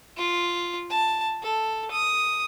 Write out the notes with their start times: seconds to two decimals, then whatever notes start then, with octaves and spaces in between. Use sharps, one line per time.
0.17 F4
0.90 A5
1.43 A4
1.91 D#6